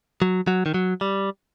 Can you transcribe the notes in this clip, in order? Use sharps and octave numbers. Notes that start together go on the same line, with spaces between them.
F#3
F#3
D#3
F#3
G3